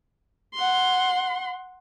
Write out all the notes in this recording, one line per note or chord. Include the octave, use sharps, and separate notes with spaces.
F#5 C6